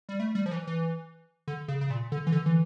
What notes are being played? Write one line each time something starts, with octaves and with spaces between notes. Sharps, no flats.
G3
A3
G3
F3
E3
E3
D3
C#3
C#3
A#2
D3
E3
D3
E3